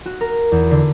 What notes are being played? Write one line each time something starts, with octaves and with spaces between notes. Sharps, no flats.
F#4
A#4
E2
D3